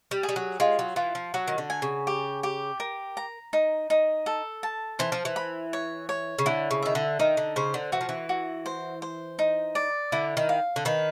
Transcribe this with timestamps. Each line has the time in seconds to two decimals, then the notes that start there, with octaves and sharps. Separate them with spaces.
0.11 G3
0.23 G#4
0.29 G3
0.36 F#3
0.60 G#3 F4
0.79 F#3
0.96 E3 F4
1.15 F3
1.34 F#3 F#4
1.48 D#3
1.58 D3
1.70 G#5
1.82 C#3
2.07 G4
2.43 G4
2.80 A#4
3.17 A#5
3.53 D#4
3.90 D#4
4.26 A4
4.63 A5
4.99 E3 C5
5.12 F3
5.25 E3
5.36 B5
5.73 C#5
6.09 C#5
6.39 C#3
6.46 D3 E4
6.71 C#3
6.82 D#3 E5
6.95 D3
7.19 D#3 D#4
7.37 D3
7.56 C#3 C5
7.74 D3
7.92 E3 F#4
8.01 F3
8.09 E3
8.29 F#4
8.66 C5
9.02 C5
9.39 D#4
9.75 D5
10.12 D3 E4
10.37 D#3
10.49 F5
10.76 D3
10.85 D#3 B4